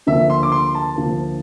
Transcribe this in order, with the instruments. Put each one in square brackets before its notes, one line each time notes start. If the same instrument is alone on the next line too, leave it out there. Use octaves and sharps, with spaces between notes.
[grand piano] D2 D3 F3 A#3 E5
C6
D6
C6
A5
D2 D3 F3 A#3